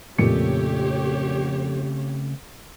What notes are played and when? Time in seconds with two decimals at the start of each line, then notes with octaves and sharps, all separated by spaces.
0.18 F2 A#2 C#3 A3 C4 G4 C#5 C#7